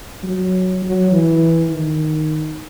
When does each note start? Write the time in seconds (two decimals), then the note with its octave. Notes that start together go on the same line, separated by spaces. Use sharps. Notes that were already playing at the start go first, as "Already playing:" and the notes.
0.23 F#3
0.82 F#3
1.12 E3
1.70 D#3